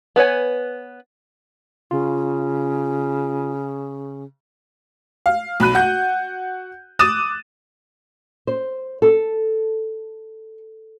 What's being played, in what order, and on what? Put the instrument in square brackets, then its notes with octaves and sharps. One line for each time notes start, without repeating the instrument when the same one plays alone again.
[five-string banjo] B3 B4 C#5 G#5
[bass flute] C#3 [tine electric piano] F4
[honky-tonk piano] F5
B1 B5 F#6 D#7
F#4 F#5 G6
D6 D#6 F#6 A6 D#7 E7
[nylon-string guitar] C5
A4